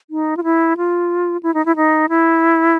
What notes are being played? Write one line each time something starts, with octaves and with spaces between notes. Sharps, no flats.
D#4
F4
E4
F4
E4
D#4
E4
D#4
E4